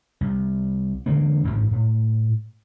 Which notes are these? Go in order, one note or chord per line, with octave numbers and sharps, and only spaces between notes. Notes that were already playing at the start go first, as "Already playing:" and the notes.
C2
D3 E3 G#3 A#3
D#1 A1 D2 G#2
A2